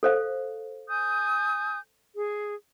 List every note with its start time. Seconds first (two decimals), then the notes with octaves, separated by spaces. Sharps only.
0.03 A4 C5 F5
0.89 G#5 D#6 G6
2.15 G#4